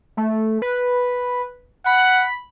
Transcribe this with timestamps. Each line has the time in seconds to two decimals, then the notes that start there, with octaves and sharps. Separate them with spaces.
0.17 A3
0.62 B4
1.86 F#5 B5